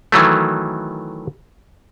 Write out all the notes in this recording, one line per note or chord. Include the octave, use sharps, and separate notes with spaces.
D#3 E3 F#3 A3